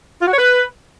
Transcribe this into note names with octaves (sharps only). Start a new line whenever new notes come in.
F4
F#4
C#5
B4